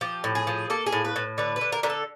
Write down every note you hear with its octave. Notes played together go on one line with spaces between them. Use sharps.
F3 G4
A2
G#4
F3
A#3 A4
G#4
A2
B4
A2
D3 B4
B4
D3
A#4
D3 A#4
A4